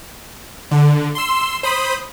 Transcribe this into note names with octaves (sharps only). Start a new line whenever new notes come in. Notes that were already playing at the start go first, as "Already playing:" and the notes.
D3
C6 E6
C5 B5 D#6